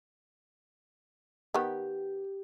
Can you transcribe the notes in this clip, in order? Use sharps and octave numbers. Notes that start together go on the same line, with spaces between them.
D#3 B3 G4